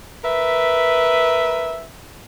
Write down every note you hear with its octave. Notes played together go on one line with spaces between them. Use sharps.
A#4 B4 E5